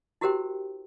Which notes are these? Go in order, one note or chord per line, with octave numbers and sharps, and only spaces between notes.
E4 F#4 G4 A#4 C5 G5